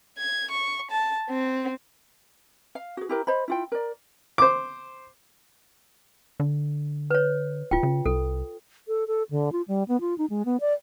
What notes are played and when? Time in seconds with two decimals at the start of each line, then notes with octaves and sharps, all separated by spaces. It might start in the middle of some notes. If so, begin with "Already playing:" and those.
0.18 G#6
0.51 C#6
0.91 A5
1.29 C4
2.75 F5
2.97 F#4 G#4
3.09 E4 G4 A#4
3.27 C5 D#5 B5
3.48 E4 F4 G5
3.72 A#4 D5
4.38 C5 D6
6.40 D3
7.11 B4 C#5
7.71 D1 F4 G5
7.83 C#3
8.06 C2 A4
8.88 A4
9.07 A4
9.31 D3
9.52 F4
9.68 G3
9.88 B3
10.01 F4
10.18 D#4
10.30 G#3
10.45 B3
10.60 D5